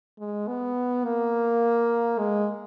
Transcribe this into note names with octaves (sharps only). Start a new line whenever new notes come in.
G#3
B3
A#3
G#3